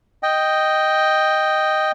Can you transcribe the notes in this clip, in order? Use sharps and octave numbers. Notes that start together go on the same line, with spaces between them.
D#5 G5